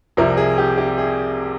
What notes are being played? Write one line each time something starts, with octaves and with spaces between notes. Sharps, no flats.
C2 C3 F3 A#4
G#4
G4
G4
G#4